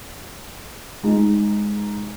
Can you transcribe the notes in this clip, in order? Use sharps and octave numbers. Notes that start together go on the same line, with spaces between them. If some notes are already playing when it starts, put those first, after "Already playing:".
G#3 D#4